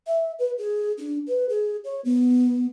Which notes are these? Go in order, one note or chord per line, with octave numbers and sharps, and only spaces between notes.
E5
B4
G#4
D4
B4
G#4
C#5
B3